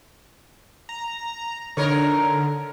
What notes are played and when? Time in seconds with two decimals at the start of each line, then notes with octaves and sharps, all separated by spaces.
0.89 A#5
1.77 D3 D#4 A#4 C#5